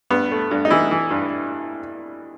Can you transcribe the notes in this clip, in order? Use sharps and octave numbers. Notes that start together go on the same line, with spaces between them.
G2 B3
A3
G2
D#4
E3 E4
E3
G2